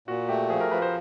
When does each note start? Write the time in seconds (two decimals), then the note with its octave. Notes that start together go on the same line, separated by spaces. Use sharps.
0.08 A#2 F#4
0.29 A3 G4
0.50 F3 G#4
0.61 A#4
0.71 F3 B4
0.82 C5